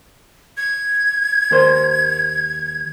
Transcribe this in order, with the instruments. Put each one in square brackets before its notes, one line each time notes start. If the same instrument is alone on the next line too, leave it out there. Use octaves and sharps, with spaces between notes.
[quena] G#6
[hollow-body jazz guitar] D#2 A#4 C5